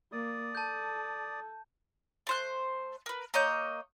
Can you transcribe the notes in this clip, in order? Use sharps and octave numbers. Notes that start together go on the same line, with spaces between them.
A#3 D5 D#6
A4 A5 G6
A3 C5 F#6
A#4 B4
A#3 C#5 D#5 G6